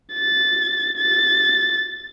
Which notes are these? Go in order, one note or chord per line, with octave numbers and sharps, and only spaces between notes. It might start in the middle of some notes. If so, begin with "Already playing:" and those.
A6
A6